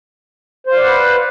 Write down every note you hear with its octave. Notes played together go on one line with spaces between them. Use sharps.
B4 C5 D5 F5 F#5